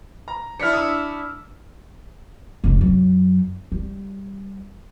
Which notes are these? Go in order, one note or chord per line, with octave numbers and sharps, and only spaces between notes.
A#5
D4 E4 F6 B6 C#7
D#6 E6
F1 G#2
F#2 F#3
G3